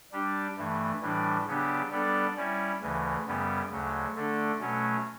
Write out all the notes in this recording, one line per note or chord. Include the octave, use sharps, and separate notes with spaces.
G3 D4 G4
G2 E3 A3
A2 E3 G3 D4
C#3 F#3 B3 D4 G4
G3 B3 D4 A4 D5
G3 C#4 E4
D2 C#3 E3
F#2 C#3 G3 B3
D2 C#3 F#3
D3 A3 D4 A4
B2 F#3 A3 C#4